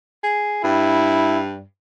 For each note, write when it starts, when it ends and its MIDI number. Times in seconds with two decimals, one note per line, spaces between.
0.23 0.64 68
0.64 1.62 43
0.64 1.40 64